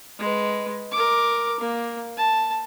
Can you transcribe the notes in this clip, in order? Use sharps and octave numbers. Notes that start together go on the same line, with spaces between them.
G#3 B4
A#4 D6
A#3
A5